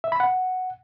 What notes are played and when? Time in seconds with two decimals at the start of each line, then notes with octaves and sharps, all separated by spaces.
0.04 E5
0.12 B5
0.20 F#5